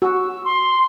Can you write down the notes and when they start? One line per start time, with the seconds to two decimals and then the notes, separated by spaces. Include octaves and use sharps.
0.02 F#4 E6
0.45 C6